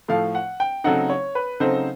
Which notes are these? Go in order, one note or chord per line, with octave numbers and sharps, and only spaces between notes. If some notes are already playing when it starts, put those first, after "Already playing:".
A2 F3 A3 F5
F#5
G5
C#3 F#3 A3 C4 D#4 F#5
C#5
B4
C#3 F#3 A3 C4 D#4 C5